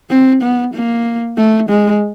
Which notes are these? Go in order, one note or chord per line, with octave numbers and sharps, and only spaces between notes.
C4
B3
A#3
A3
G#3